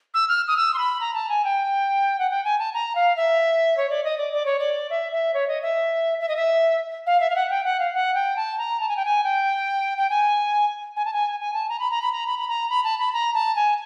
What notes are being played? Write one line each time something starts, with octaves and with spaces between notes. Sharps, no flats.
E6
F6
D#6
E6
C6
B5
A#5
A5
G#5
G5
F#5
G5
G#5
A5
A#5
F5
E5
C#5
D5
D#5
D5
D5
C#5
D5
E5
E5
C#5
D#5
E5
E5
D#5
E5
F5
E5
F5
F#5
G5
F#5
F5
F#5
G5
A5
A#5
A5
G#5
G5
G#5
G5
G5
G#5
G#5
A5
G#5
G#5
A5
A#5
B5
A#5
B5
A#5
B5
B5
A#5
B5
A5
B5
A#5
A5
G#5